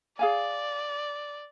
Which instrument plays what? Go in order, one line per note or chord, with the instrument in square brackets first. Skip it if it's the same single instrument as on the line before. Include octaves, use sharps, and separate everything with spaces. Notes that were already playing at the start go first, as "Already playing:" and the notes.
[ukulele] G#4 F5 G#5 [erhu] D5